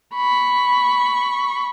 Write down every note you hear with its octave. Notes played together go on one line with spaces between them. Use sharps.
B5 C#6